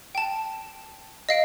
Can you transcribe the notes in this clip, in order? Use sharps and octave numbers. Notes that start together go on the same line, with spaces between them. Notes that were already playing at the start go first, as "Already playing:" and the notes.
G5 A5
D#5 F5 D7